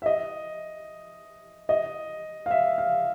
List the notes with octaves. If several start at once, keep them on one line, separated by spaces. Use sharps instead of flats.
E5
D#5
D#5
F5
E5
F5